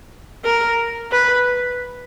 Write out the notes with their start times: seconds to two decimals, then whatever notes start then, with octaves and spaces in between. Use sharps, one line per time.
0.45 A#4
1.12 B4